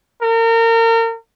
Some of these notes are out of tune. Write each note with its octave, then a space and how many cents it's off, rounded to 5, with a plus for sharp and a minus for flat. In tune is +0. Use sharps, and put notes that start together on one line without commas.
A#4 -35